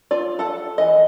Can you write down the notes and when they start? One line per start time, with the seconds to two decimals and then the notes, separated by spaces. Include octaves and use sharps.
0.11 F4 D5
0.39 A4 F#5
0.78 E3 D#5